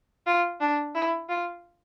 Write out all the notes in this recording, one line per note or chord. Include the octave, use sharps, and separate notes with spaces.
F4
D4
E4
F4